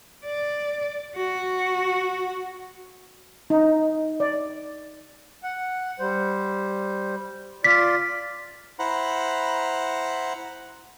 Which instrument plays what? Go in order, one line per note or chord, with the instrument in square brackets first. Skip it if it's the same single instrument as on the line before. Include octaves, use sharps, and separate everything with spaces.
[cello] D5
F#4
[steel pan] D#4
D5
[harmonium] F#5
G3 C5
[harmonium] F4 D5 [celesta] B6
[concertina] E4 C5 F#5 A#5 B5